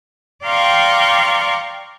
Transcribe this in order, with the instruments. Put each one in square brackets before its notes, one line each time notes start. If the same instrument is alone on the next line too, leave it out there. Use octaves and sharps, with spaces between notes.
[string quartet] D5 F5 G5 A#5 C6 C#6